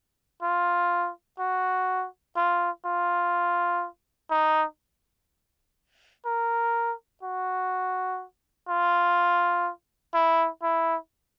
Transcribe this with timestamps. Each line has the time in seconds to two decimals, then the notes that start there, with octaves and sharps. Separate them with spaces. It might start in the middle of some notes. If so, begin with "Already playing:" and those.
0.42 F4
1.39 F#4
2.36 F4
2.85 F4
4.30 D#4
6.25 A#4
7.23 F#4
8.69 F4
10.14 E4
10.62 E4